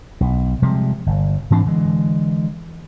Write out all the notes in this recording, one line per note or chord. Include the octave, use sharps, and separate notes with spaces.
B1
C3 F3 G3 G#3
G1
G#2 E3 C4 D4
D3 E3 G#3